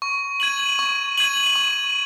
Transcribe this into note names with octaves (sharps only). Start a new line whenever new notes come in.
C#6
G#6 D#7 F#7
C#6
G#6 D#7 F#7
C#6